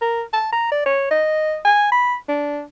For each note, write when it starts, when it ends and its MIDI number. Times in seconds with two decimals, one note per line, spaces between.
0.01 0.22 70
0.33 0.52 81
0.53 0.70 82
0.72 0.81 74
0.86 1.07 73
1.11 1.58 75
1.65 1.91 80
1.92 2.15 83
2.28 2.62 62